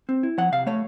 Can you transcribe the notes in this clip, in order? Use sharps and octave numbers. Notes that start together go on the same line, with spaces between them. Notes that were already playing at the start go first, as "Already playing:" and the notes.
C4
E4
F3 F#5
C3 F5
A3 C#5